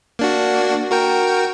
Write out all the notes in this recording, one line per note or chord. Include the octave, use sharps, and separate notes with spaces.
A#3 D4 F#4
F#4 A#4 G5